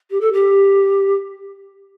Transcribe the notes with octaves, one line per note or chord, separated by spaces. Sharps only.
G4
A4
G4